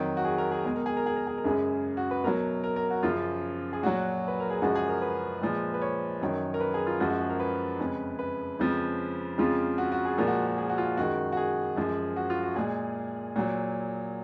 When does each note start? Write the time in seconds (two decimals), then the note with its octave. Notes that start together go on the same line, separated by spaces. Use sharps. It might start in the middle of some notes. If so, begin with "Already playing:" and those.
Already playing: F2 D#3 F#3 F#4
0.17 F#4
0.25 G#4
0.38 A#4
0.51 G#4
0.65 B2 G#3 G#4
0.76 A#4
0.86 G#4
0.97 A#4
1.06 G#4
1.16 A#4
1.27 G#4
1.38 A#4
1.44 F#2 C#3 G#3 G#4
1.97 F#4
2.11 B4
2.24 B2 F#3 A#4
2.64 A#4
2.76 A#4
2.90 F#4
3.03 F#2 C#3 F3 F4
3.73 G#4
3.83 A#2 F#3 F#4
4.28 B4
4.40 A#4
4.50 G#4
4.61 F#2 C#3 F3 G#3 F#4
4.75 G#4
4.89 A#4
5.02 B4
5.41 A#2 F3 G#3
5.74 B4
5.82 C#5
6.21 F#2 D#3 F#3
6.54 A#4
6.60 B4
6.74 G#4
6.87 F4
7.00 F#2 F3 G#3 F#4
7.10 F#4
7.20 G#4
7.30 A#4
7.40 B4
7.80 F2 C#3 G#3
8.19 B4
8.59 F2 C#3 F3 G#3
9.38 F2 C#3 F3 G#3 F4
9.78 F#4
9.92 F#4
10.05 G#4
10.18 A#2 F3 G#3 A#4
10.27 F#4
10.47 F#4
10.58 G#4
10.69 F#4
10.78 F4
10.97 F#2 D#3 G#3 F#4
11.32 F#4
11.37 G#4
11.76 F#2 F3 G#3
12.16 F#4
12.30 F4
12.43 F#4
12.56 A#2 G#3 G#4
13.36 A#2 F#3